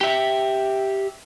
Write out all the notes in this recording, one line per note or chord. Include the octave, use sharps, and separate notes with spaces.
G4 E5